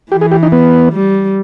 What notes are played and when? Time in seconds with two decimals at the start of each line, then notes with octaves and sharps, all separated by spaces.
0.12 E3 G4
0.21 G#4
0.31 G4
0.43 D#4
0.52 B3
0.92 G3